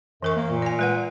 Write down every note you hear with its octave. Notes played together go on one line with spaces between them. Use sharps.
F#2 E3 A#4 C#6
A#3
A#2
D5 G#5
G#3 B4 F#5